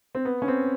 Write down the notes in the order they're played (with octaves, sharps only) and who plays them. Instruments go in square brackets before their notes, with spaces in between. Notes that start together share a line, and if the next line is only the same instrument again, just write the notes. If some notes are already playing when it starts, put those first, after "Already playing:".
[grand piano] C4
B3
C#4
C4